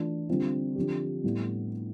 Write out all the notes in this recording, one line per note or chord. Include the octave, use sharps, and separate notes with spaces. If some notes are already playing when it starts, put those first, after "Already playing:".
Already playing: E3 A3 D4 F4
D3 G3 C4 F4
D3 F3 C4 G4
A2 G3 B3 E4